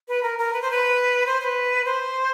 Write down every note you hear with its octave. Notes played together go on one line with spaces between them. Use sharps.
B4
A#4
A#4
B4
C5
B4
C5
C5
B4
C5